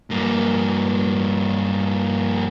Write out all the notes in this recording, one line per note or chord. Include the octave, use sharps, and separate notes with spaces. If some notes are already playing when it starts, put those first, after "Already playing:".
G2 A#3